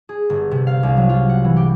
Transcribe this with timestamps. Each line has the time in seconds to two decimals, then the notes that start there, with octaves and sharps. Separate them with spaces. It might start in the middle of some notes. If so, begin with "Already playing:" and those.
0.09 G#4
0.30 G1
0.51 C3
0.67 F5
0.83 C2
0.97 F#3
1.09 F4
1.29 F#5
1.44 E3
1.56 G4